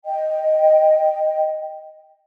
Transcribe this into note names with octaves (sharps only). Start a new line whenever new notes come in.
D#5 G5